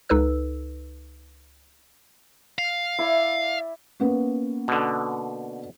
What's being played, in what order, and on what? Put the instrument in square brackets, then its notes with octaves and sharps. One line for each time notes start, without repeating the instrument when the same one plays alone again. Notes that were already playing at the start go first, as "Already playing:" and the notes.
[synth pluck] C#2 D#4 A4 B4 E6
[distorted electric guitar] F5
[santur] E4 D5 B5
[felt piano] A#3 B3 C#4
[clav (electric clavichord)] B2 D3